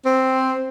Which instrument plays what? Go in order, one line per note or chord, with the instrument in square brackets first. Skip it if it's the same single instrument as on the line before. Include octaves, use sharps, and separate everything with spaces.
[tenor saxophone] C4